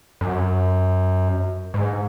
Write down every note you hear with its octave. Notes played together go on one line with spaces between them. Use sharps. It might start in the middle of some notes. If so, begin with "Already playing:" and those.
F#2
G#2